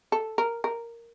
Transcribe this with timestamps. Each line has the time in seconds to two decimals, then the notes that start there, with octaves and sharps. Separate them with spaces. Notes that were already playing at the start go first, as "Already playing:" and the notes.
0.12 A4
0.38 A#4
0.64 A#4